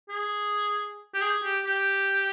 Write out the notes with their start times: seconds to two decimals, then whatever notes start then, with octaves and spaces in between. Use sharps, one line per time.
0.09 G#4
1.14 G4
1.21 G#4
1.44 G4
1.65 G4